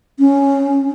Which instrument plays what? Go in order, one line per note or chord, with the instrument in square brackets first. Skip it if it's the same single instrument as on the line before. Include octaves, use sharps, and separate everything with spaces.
[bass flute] C#4